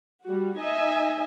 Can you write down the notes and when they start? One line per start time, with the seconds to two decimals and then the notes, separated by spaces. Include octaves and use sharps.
0.23 G3 F#4
0.58 D#4 D#5 E5 G#5